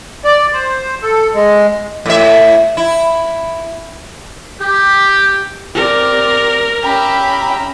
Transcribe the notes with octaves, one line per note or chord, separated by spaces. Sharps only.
D5
C5
A4
G#3
A2 E5
E4
G4
C4 G4 A#4 D5
C#4 G4 E5 A#5 B5